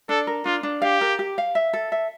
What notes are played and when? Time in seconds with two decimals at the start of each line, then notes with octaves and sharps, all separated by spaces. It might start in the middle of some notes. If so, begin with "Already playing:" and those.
0.09 D4 A4
0.27 A#4
0.45 D4 F4
0.63 D4
0.82 G4 F5
1.01 A#4
1.19 G4
1.38 F5
1.55 E5
1.73 A4
1.92 E5